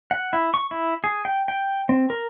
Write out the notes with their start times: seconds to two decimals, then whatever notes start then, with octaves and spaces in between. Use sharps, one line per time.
0.11 F#5
0.33 E4
0.54 C#6
0.71 E4
1.04 G#4
1.25 G5
1.48 G5
1.89 C4
2.10 A#4